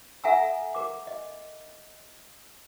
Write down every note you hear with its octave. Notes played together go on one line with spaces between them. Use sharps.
A4 E5 F#5 G#5 A#5 E6
A#4 D6
D#5